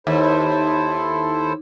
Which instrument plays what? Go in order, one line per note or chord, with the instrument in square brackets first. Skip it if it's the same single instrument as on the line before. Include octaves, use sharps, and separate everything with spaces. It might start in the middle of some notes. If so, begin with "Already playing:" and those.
[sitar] D#2 [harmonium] E4 A4 C5